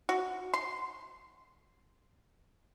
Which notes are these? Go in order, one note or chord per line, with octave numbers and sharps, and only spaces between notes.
F#4
C6